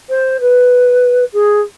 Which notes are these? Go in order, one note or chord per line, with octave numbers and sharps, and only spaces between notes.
C5
B4
G#4